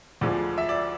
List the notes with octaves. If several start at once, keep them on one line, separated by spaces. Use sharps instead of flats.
D2 D3 F3 G#3 D5
E5
D5